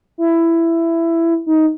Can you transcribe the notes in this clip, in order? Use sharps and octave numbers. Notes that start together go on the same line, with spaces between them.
E4
D#4